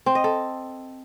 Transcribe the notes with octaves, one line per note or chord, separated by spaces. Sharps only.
C4
D#5
A4